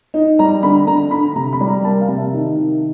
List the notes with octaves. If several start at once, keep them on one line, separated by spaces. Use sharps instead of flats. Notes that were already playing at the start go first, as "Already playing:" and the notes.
D#4
G3 A#5
D3 B5
D3 A#5
D3 B5
C3 A#5
B5
G3
A#5
A#3 A5
F5
C3
E5
D#3
D#3